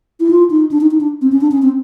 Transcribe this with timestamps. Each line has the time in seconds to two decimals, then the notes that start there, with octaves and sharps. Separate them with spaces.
0.20 E4
0.31 F4
0.50 D#4
0.71 D4
0.81 D#4
0.91 D#4
1.01 D4
1.22 C4
1.32 C#4
1.41 D4
1.51 C#4
1.62 C4